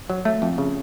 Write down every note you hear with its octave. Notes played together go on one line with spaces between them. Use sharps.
F#3
A3
F2
C#3